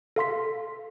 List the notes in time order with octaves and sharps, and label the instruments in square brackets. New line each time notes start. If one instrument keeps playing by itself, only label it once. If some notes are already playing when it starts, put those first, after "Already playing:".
[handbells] A4 F5 C6 B6